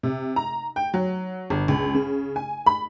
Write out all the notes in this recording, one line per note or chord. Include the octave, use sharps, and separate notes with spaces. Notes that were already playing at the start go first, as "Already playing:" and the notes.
C3
A#5
G5
F#3
G1
C#2
C#3
G#5
B5